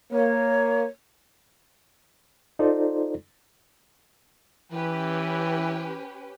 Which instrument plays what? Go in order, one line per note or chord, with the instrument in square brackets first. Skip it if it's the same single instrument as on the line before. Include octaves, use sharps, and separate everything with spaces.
[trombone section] A#3 [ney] C#5
[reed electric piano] D#4 F4 A4 C5 D5
[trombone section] E3 [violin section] C#4 G4 B4